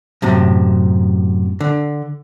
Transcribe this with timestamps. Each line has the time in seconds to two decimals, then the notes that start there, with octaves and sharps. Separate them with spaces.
0.22 F#2 A2 C3
1.60 D3